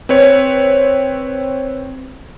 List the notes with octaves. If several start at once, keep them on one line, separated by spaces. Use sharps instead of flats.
C4 B4 C#5